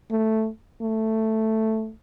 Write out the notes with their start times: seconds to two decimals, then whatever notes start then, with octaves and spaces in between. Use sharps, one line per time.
0.11 A3
0.82 A3